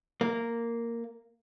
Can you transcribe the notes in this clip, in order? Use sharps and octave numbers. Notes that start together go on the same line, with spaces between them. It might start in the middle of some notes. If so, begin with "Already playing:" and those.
A#3